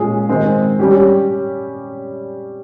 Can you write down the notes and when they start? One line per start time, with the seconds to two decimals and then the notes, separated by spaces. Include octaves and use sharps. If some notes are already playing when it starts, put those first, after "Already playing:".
Already playing: A#2 G#3 C#4 G#4
0.29 D#3 G#3 C4
0.79 G3 C#4 G4